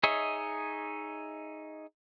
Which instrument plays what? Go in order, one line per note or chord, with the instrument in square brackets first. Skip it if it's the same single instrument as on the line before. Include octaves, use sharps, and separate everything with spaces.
[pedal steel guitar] D#4 G#4 C#5 D#5 E5